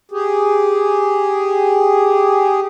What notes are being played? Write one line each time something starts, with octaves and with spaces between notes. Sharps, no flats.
G4 G#4